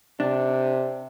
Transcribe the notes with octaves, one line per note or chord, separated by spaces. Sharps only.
C3 D4